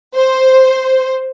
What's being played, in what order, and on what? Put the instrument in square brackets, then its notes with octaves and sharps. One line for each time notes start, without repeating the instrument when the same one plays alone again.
[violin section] C5